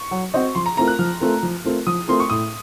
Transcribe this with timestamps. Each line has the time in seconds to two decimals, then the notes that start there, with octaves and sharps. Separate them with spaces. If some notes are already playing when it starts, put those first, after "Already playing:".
Already playing: C#6
0.11 F#3
0.34 C4 F#4 C5 D#5
0.55 F3 C6
0.66 A#5
0.77 A3 C4 F4 A#4 A#5
0.88 F#6
0.99 F3 F6
1.20 A3 C4 F4 A#4
1.43 F3
1.64 A3 C4 F4 A#4
1.87 F3 D#6
2.08 A3 C4 F4 A#4 C6
2.20 C#6
2.30 A2 D#6